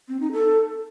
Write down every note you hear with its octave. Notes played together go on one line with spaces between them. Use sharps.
C4
D#4
A4